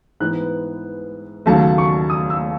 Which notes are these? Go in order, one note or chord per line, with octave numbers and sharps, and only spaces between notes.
G#2 E3 B3 F#6
D#2 C#3 F#3 A3 A5
C#6
D#6
E6